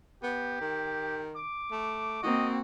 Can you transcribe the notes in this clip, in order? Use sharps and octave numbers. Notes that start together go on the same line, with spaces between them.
B3 G4
D#3
D6
A3
A#3 C4 F#4 D#5